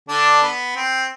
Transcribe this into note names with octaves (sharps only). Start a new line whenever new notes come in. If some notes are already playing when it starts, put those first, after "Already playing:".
D3 D4
B3
C4